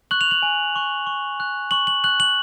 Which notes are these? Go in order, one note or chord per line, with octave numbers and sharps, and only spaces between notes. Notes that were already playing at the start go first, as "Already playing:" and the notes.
C#6 F#6 F#7
F7
F#7
G#5
C#6 F#6
C#6
F#6
C#6 F#7
F#7
F#6 F#7
F#7